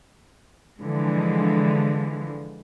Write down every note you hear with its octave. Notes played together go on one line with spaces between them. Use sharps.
D3 E3 F3 G#3